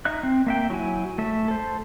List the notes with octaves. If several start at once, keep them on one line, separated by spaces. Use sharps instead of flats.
D#4 E5 F#6
C4
A#3 E5 G5
F#3 E4 F#4 G#5
A3 E5
A4 C5